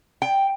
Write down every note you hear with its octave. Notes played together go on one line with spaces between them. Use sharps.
G5